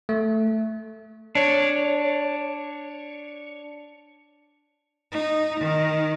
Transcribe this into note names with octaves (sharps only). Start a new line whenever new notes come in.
A3
D4 C#5
D#4
D#3